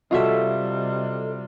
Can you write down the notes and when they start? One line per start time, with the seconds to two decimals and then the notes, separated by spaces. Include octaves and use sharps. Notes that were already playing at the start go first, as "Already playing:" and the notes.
0.11 C3 G3 F4 F#4 A4 D#5 E5